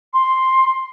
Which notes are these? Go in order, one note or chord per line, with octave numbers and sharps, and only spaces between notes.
C6